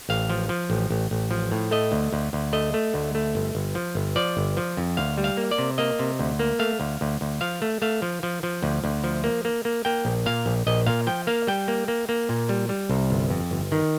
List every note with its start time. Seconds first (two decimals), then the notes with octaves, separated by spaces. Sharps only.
0.09 A1 F5
0.30 F3
0.49 F3
0.70 A1
0.91 A1
1.11 A1
1.31 F3
1.52 A2
1.71 A3 D#5
1.92 D2
2.13 D2
2.33 D2
2.53 A3 D#5
2.74 A3
2.94 D2
3.15 A3
3.35 G1
3.55 G1
3.75 F3
3.95 G1
4.16 F3 D5
4.37 G1
4.57 F3
4.77 F2
4.97 D2 F5
5.18 G3
5.24 F5
5.37 A#3
5.51 D5
5.58 C3
5.78 A#3 D#5
5.99 C3
6.19 D2
6.39 A#3
6.59 A3 F5
6.80 D2
7.01 D2
7.21 D2
7.41 F3 F5
7.62 A3
7.82 A3 F5
8.02 F3
8.23 F3
8.43 F3
8.63 D2
8.84 D2
9.04 F3
9.24 A#3
9.45 A#3
9.65 A#3
9.85 A#3 G5
10.05 A#1
10.26 A#2 F5
10.46 A#1
10.67 A#1 D#5
10.86 A#2 F5
11.07 F3 G5
11.27 A#3 F5
11.47 G3 G5
11.68 A#3
11.88 A#3
12.09 A#3
12.29 A#2
12.49 G3
12.69 G3
12.90 C2
13.10 G1
13.30 F2
13.51 G1
13.72 D#3